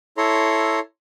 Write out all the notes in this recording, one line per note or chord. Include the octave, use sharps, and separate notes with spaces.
E4 A4 C#5 A#5 C6